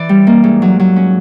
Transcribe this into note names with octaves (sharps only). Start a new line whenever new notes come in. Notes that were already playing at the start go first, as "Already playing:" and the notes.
Already playing: E3 D5
G3
A#3
G#2
F#3
F#3
C#4